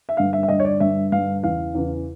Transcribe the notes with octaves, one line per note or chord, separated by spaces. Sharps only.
E5
G2 D3 F5
E5
E5
G2 D3 D#5
C#5
D5
G2 D3 E5
G2 D3 F5
E2 C#3 E3 F5
E2 C#3 E3